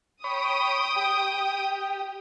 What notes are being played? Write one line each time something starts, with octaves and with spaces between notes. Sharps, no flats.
C#5 G5 B5 D#6
G4